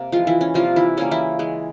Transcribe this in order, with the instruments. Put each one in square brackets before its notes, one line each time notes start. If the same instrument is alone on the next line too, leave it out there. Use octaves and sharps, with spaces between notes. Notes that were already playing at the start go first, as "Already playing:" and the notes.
Already playing: [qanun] C3 A#3
E3 F3 G#3 F4
E3 E4
C#4
C3 F3 G3 A#3 F4
E3 E4
C#3 G3 A#3 C#4
E3 E4
E3 G#3